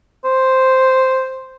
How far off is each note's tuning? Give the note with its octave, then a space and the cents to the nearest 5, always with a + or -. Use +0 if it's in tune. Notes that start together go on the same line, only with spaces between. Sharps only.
C5 +0